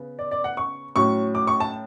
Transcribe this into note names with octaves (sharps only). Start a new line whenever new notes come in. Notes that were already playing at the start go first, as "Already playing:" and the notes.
Already playing: C#3 B3
D5
D5
F#5
C#6
A2 F#3 C#4 C#6
D6
C#6
A5